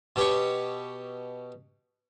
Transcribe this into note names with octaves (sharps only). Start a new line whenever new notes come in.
B2 G4 C#5